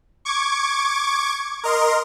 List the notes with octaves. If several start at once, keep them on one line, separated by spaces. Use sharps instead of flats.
C#6 D6 G#6
A#4 D#5 C6